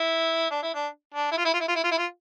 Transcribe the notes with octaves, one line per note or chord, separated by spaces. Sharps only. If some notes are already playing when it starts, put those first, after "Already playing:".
Already playing: E4
D4
E4
D4
D4
E4
F4
E4
F4
E4
F4
E4
F4
E4
F4